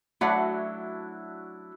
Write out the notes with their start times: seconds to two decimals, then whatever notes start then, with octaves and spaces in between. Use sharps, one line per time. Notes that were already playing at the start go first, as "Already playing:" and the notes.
0.21 F#3 A3 D4 E4 F#4 F#5